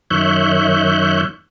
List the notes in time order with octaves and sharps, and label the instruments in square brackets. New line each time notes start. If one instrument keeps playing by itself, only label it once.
[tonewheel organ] F#2 D#3 C#5 E5 F#6 G6